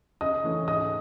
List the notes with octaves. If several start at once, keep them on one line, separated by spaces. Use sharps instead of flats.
C#3 D#5 D#6
E3 A3 C#4
G#2 D#5 D#6